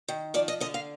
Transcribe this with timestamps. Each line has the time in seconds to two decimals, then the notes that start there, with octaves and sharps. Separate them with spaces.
0.08 D#3
0.34 F3 D5
0.48 D#5
0.60 D3 D#5
0.74 F5